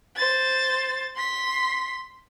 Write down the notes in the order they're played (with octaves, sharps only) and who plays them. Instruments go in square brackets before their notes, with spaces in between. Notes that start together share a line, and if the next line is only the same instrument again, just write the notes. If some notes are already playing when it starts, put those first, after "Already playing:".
[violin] C5 A6
C6 B6